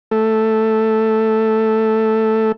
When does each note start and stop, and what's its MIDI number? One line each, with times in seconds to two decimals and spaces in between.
0.11 2.52 57
0.11 2.52 69